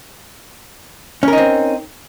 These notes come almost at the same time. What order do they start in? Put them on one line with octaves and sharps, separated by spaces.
C#4 A#4 D#4 C4